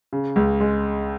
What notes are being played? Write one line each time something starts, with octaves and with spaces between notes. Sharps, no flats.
C#3
C#2
G#3